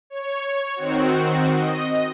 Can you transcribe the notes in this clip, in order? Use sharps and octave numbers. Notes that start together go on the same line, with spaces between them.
C#5
D#3 C4 F#4
D#5